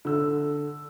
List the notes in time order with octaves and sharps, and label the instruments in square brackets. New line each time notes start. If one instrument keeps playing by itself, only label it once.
[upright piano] D3 E6